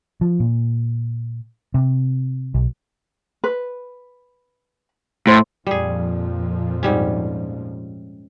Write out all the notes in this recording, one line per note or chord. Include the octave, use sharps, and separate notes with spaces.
F3
A#2
C3
B1
B4
A2 C5
F2 A#2 F3 G3 G#4
G#2 G3 C#4